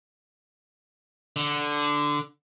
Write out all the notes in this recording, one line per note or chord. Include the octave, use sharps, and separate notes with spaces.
D3